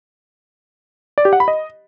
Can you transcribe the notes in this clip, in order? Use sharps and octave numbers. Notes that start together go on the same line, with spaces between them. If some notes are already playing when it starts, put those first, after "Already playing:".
D5
G4
F#5
B5
D#5